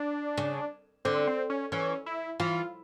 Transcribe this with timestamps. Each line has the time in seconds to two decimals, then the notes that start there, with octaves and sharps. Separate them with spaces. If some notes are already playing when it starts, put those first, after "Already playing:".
Already playing: D4
0.38 C#3
1.05 D3 C4
1.27 C4
1.50 C#4
1.72 E3 C#4
2.06 E4
2.40 E3 F4